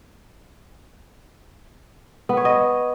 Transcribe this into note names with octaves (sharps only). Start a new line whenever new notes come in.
B3
C#5
D#5